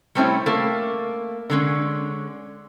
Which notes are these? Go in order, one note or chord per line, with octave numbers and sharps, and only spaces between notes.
G3 A3 C4 C#4 E4
A3 A#3
D3 G#3 C#4